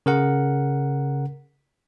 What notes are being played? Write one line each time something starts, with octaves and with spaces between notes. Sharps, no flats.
C#3 A#4 F#5